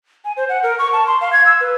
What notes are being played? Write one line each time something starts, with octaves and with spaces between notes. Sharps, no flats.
G#5
C5
F#5
A#4
C#6
A5
C6
F5
G#6
E6
B4